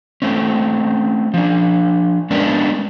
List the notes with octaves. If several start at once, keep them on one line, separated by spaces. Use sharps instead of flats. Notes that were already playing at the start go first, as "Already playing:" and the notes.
A3 C4 C#4
F3 D4
G#3 B3 C#4 D4 A#4 B4